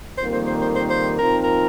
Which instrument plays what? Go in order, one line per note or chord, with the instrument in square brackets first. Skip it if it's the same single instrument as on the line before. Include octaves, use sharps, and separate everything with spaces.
[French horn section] F2 D#3 G3 A#3 [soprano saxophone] C5
[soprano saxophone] C5
C5
C5
C5
C5
[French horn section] A#2 F3 C4 D#4 [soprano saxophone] A#4
[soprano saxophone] A#4